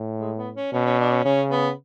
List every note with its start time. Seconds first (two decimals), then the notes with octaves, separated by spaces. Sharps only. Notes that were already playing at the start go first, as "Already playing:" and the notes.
Already playing: A2
0.20 G#3
0.37 B3
0.55 C#4
0.72 B2 C#4
0.86 C#4
0.99 D4
1.11 C#4
1.25 C#3 C#4
1.51 B3